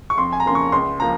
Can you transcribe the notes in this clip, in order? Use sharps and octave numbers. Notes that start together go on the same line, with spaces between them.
C#6
F2 C6
G#5
A#5
C#3 F3 A#3 C6
C#6
C#2 C6
F3 A#3 A#5